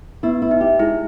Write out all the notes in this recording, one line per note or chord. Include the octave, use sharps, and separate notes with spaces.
B3 E4
E4
D#4
G4
G#3 E4